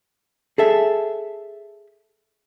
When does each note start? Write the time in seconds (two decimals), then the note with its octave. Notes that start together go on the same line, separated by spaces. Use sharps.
0.58 G#4 A4 E5